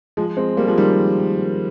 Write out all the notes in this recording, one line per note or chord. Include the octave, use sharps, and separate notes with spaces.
F3 G#3
G#3 C4
G3 A#3
F3 G#3
D#3 G3